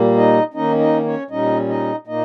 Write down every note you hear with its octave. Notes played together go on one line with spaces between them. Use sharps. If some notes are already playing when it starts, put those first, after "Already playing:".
Already playing: A#2 G3 A#3
D#4 D#5
D#3 A#3 C#4 D#4 D#5
D#4 D#5
C#4 C#5
A#2 G3 C#4 D#4 D#5
D#4 D#5
A#2 A#3 D#4 D#5